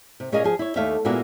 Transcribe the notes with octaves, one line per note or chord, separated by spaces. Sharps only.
C3
A#2 C#4 G#4 A#4 D#5 F5
F3 G#4
E4 C#5
D#2 A3 C#5 E5 F5
A#2 G#3 A#3 B3 E4 F#4